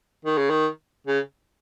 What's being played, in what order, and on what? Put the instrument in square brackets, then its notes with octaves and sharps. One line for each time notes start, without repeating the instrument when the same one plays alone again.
[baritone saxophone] D#3
C#3
D#3
C#3